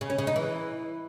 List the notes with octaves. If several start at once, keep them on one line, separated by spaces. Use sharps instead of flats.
C#3
C#4
C#3
D#4
E3